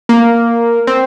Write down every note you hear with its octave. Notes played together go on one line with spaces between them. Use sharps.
A#3
C4